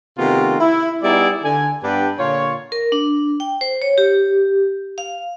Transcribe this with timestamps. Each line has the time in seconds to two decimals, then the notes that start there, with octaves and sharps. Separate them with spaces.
0.18 C3 D#3 A3 B3 F4 F#4
0.60 E4
1.03 G3 B3 D#4 E4 G#4 D5
1.43 D3 G#5
1.83 G2 B3 D4 G4 B4 G5
2.19 A#2 D3 F4 C#5
2.72 A#4
2.92 D4
3.40 G5
3.61 C5
3.82 C#5
3.98 G4
4.98 F5